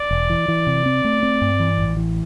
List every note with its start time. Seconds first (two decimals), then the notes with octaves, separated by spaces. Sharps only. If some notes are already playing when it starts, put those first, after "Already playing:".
Already playing: D5
0.11 E1
0.30 E3
0.48 E3
0.67 C3
0.86 C4
1.05 A3
1.23 C4
1.41 G2
1.60 E3
1.79 A1
1.97 E3